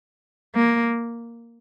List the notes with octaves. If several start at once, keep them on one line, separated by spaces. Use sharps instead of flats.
A#3